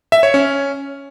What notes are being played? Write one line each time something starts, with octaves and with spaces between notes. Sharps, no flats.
E5
C#5
C#4